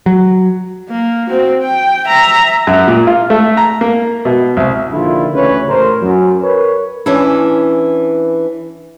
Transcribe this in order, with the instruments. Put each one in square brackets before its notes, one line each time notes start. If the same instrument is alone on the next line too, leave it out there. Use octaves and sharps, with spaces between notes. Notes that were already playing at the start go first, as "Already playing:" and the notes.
[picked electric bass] F#3
[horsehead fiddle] A#3
C4 F#4
G5
E5 A#5
[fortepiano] F#2
A#2
F4
A3
A#5
A#3
B2
C2
[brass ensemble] A#1 D3 D#3 E4 F4
D2 C#3 E3 B4 C#5
A1 A#4 C5
F#2
A#4 B4 C#5
[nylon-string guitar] E3 C#4 D4 E4